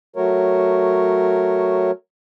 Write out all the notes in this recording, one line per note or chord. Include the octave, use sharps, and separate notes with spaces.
F#3 A3 F#4 A#4 C#5